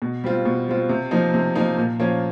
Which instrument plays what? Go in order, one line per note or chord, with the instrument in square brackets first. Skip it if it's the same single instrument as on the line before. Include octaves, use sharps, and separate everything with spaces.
[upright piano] B2
G3 C4 F4
B2
G3 C4 F4
C3
F3 A#3 D#4
C3
F3 A#3 D#4
A#2
F3 A#3 C#4